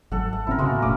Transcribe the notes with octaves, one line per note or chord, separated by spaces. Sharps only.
G#1 F#3 A4 F#5
F#5
A1 C4 E4 A#4
C#3 G#3 A#3 F#4
A2 B3
F1 A#2 A3 C#4 D6 D#6